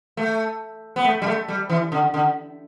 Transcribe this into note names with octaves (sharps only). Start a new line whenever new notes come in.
A3
B3
A3
G3
A3
G3
E3
D3
D3